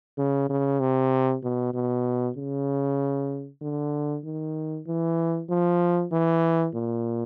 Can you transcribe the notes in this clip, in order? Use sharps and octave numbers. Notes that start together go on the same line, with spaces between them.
C#3
C#3
C3
B2
B2
C#3
D3
D#3
E3
F3
E3
A#2